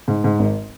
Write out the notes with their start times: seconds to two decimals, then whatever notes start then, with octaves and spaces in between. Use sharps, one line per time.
0.08 G#2
0.24 G#2
0.39 G#1